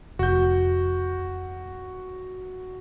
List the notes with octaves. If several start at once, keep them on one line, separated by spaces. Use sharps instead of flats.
F1 F#4 G6